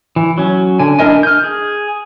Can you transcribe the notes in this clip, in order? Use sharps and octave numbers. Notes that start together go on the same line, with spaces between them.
E3
F#3 C#4
D3 G#5
D4 E4 A#4 D#5 G#5
F6 G6
G#4